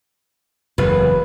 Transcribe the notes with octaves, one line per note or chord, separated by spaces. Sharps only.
F#1 E2 B4